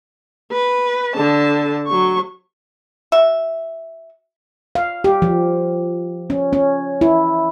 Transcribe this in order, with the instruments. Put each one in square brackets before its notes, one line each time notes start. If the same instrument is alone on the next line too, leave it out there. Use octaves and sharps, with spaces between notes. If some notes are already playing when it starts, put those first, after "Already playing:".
[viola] B4
D3 A5
F#3 C#6
[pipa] F#4 E5
[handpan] F5
G4
F3
C#4
C#4
E4